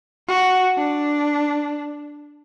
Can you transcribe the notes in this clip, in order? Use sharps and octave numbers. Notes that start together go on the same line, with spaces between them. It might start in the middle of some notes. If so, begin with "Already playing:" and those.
F#4
D4